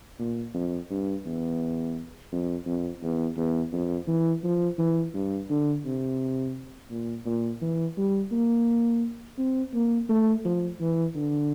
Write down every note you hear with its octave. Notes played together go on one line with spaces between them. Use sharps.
A#2
F2
G2
E2
F2
F2
E2
E2
F2
E3
F3
E3
G2
D3
C3
A#2
A#2
E3
G3
A#3
C4
A#3
A3
F3
E3
D3